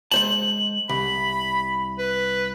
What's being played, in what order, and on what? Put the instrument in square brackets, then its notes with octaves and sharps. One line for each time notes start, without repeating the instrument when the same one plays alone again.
[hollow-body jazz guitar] G#3 C5 A5 [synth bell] F#7
[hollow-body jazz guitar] C2 [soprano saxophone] B5
[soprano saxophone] B4